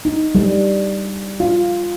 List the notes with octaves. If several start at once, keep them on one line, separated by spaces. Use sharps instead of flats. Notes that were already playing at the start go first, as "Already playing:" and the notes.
D#4
G3
F4